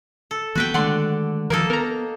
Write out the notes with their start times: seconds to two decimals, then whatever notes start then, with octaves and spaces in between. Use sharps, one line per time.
0.31 A4
0.55 E3 A#3 B3 F#4 B4 G5
0.74 D3 D#3 G#3 A3 D5 F#5 C6
1.50 D#3 F3 A#3 D#4 A4 A#4 G#6
1.70 B3 A#4 A#5